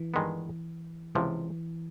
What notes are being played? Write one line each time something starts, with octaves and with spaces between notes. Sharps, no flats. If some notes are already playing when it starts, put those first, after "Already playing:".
Already playing: E3
G2 D#3 G#3 B3
C#2 C3 E3 F3